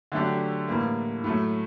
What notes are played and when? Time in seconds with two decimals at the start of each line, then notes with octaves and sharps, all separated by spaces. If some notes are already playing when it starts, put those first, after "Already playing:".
0.12 D3 F#3 A3 D4 G4
0.68 A2 E3 G3 A#3
1.24 A2 F#3 A3